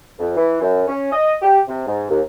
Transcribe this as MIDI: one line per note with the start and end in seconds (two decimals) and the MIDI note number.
0.19 0.36 41
0.36 0.60 52
0.61 0.83 42
0.88 1.12 61
1.12 1.35 75
1.42 1.59 67
1.68 1.86 48
1.87 2.07 44
2.09 2.20 39